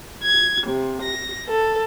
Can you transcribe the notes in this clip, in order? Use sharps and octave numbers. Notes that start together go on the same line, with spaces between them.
G#6
C3
A#6
A4